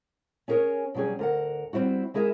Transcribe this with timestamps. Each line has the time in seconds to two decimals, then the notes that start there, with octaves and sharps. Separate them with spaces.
0.48 C#4 G#4 A#4 B4 C#5 G#5
0.94 B2 F#3 G3 C#4 G#4
1.19 D2 A#4 F#5
1.73 G3 C4 E4 F#4
2.14 G#3 E4 G#4 A#4 E5